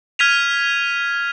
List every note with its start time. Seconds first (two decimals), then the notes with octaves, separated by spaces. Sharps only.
0.19 F6 G#6 B6 D#7 F7